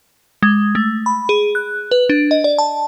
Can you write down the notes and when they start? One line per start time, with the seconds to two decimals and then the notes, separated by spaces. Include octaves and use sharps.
0.43 G#3
0.75 A3
1.06 B5
1.29 G#4
1.55 F#6
1.91 B4
2.09 D4
2.31 D#5
2.44 D5
2.58 A5